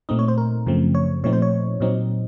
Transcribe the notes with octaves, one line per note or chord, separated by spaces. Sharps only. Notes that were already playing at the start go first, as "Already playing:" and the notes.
A#2 A3 C4 D#4 D#5
C#5
C5
A#4
F#2 C#3 F3 A3 C4
C#5
A#2 F3 A3 C4 D#4 C#5
C5
C#5
A#2 F#3 C4 D#4